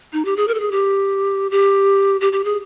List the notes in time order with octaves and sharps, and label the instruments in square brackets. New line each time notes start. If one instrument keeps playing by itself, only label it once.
[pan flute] D#4
G4
G#4
A#4
A4
G#4
G4
G4
G4
G4
G#4